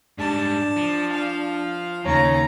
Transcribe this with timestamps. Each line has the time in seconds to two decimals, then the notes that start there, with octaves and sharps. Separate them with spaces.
0.18 G#2 G3 D4 A5
0.77 F3
1.12 F5
2.05 D#2 C#3 C#5 A#5